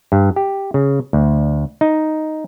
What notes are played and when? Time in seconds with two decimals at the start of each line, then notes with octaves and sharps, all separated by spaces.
0.12 G2
0.36 G4
0.74 C#3
1.13 D2
1.81 D#4